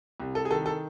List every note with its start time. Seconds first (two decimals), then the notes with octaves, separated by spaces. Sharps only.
0.20 C2
0.35 A4
0.45 G#4
0.50 D#3 A4
0.66 A4